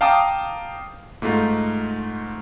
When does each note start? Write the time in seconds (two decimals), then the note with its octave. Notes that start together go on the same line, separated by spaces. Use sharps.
0.01 F5 G5 A5 A#5 D6 D#6
1.22 G#2 A3 D#4 F4